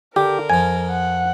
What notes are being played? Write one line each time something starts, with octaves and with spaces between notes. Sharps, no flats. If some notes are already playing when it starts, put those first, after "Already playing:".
D3 G4 A#4
F2 F3 G#5
F#5